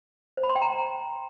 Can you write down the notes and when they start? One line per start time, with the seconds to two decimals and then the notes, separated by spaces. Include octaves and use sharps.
0.37 C5
0.43 B5
0.49 C6
0.56 G5
0.62 A#5